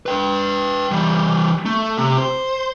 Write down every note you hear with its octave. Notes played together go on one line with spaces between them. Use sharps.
B4 G5
E3 G3
A3
C3
C5